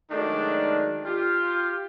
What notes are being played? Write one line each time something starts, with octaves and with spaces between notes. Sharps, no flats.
D#3 F#3 G#3 A3 D4
F4 G4